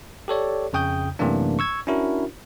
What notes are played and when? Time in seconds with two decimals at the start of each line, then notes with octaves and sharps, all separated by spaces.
0.28 G4 A4 C#5 D5
0.73 F2 C#3 G5 D#6 G6
1.19 F#2 C3 E3 A3 A#3 D4
1.59 C#6 E6 G#6
1.87 C#4 D4 E4 F#4 A#4